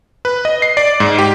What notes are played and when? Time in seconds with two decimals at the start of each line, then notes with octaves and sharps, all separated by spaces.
0.25 B4
0.45 D#5
0.62 C7
0.77 D5
1.00 G#2
1.19 G4